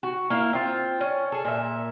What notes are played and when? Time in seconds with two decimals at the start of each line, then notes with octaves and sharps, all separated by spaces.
0.03 F#4
0.30 A#3 E4 F5
0.53 C4 F4
1.01 C#4
1.32 G#4 A4
1.45 A#2 E5